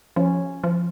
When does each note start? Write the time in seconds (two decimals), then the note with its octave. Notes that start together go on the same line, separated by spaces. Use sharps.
0.16 F3 C#4
0.64 F3